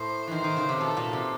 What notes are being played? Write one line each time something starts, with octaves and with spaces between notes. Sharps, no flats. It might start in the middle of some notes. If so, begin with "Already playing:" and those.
Already playing: A2 C5
D#3 E3 C5
D#3
C#3
C3
B2 A4
A#2
C3